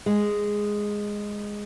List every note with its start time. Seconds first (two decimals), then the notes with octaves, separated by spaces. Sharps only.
0.06 G#3